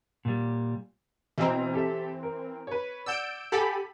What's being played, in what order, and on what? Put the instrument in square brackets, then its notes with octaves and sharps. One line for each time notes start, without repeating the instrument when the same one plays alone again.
[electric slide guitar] A#2 G3
[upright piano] B2 D#5 A#5 [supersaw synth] E3 C4
[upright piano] G4 A4 E5
A#4
B4 C#5
[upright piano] D5 F#5 [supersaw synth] E6 G6 D7
[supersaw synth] G4 A4 B5 [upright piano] F#5 G#5